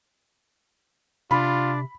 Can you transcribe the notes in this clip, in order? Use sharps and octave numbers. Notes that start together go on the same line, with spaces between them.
C3 D4 F4 B5